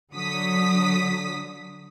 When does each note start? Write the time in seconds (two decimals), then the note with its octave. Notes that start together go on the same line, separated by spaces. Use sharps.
0.14 D3 F#3 D#6 B6